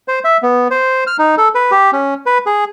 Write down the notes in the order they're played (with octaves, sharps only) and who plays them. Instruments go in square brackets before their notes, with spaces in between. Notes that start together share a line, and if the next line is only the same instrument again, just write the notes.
[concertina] C5
E5
B3
C5
F6
D#4
A4
B4
G4
C#4
B4
G#4